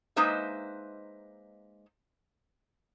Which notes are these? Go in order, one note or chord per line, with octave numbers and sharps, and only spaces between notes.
G#3 A#3 D#4 B4 C5 E5